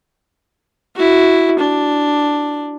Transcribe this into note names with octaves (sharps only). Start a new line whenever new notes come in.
E4 F#4
D4